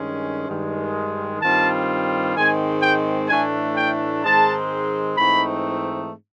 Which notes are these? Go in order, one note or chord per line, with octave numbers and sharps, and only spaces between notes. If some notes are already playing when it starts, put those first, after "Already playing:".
Already playing: G2 D#3 G#3 C#4
G2 D#3 G#3
G2 D#3 G3 C4 F4 A5
G#2 D#3 G#3 C4 G#5
G5
A2 E3 A3 D4 G#5
G5
G#2 D#3 G#3 C4 A5
G#2 E3 A3 C4 D#4 B5